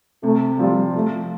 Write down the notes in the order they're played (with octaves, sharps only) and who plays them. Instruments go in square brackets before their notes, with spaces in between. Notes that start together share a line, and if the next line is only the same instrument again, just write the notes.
[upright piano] C3 [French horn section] A3
[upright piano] F3 C4 F4 [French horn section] G3
[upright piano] F3 [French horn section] A3